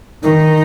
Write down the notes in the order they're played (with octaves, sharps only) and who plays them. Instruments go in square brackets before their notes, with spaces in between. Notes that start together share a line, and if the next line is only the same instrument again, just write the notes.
[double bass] D#3 [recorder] D#4